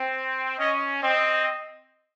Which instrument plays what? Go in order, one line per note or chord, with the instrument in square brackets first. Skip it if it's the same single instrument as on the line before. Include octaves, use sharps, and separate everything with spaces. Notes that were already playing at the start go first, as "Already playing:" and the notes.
Already playing: [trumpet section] C4
[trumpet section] C#4 [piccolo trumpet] D#5
[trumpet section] C4 [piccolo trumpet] D#5